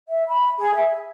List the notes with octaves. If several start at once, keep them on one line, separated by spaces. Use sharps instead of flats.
E5
B5
G#4
E5